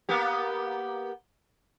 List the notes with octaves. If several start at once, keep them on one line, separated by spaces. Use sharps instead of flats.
A#3 B3 G4